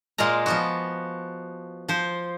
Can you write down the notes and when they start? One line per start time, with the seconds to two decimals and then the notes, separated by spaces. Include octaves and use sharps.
0.18 A#2 G#3 F4 A#4 A#5
0.46 F3 B3 F#4
1.89 F3 C5